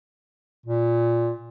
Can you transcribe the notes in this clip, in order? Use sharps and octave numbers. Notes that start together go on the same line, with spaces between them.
A#2